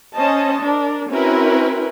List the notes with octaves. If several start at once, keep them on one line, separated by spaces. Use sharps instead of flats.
C#4 C5 D#5 A5
D4 A#4
C4 C#4 E4 F#4 A#4 B4